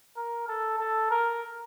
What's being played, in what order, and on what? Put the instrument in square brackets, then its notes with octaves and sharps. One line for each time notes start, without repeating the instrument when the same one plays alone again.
[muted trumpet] A#4
A4
A4
A#4